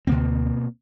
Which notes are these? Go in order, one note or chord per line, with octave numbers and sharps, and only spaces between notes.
D2 B2 A#3 C4